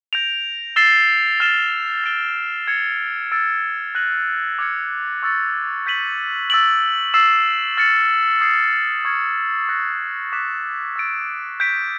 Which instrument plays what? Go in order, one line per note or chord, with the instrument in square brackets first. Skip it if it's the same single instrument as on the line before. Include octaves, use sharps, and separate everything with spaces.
[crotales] G6 A#6 D7 F7
E6 A6 C7 E7 G7
F6 A6 C7 E7 G7
A6 D7 G7
G#6 C#7 F7
E6 A6 D7
F#6 A#6 D#7 F#7
D6 F6 G#6 C#7
C#6 E6 A6 C#7
G6 B6 D#7 F#7
E6 A6 D7 F#7
E6 A6 C7 E7
F6 A6 C#7
D#6 G#6 C7
C#6 F6 G#6 C#7
C#6 F#6 A#6 C#7
D6 F#6 B6 E7
E6 A6 D7
G6 B6 D7